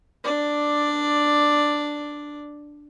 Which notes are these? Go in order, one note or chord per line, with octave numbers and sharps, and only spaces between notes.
D4 D5